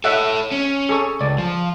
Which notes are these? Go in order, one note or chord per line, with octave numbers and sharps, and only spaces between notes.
A4 C#5 D#5 E5 F#5
C#4
G#4 A4 C#6
C#2 D5
F3